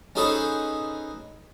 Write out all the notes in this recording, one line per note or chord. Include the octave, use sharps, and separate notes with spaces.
C#4 D#4 G#4 A4 B4 C5